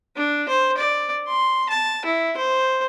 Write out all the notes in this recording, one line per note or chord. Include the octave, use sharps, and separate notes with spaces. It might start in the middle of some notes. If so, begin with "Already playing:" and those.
D4
C5
D5
C6
A5
E4
C5